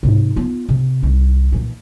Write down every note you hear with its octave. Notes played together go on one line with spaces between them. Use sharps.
G#2 C3
B3 F4
C3
C2 D#3
A#2 E3